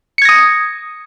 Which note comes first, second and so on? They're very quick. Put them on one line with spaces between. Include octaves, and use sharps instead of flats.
C#7 G#6 A#6 D#6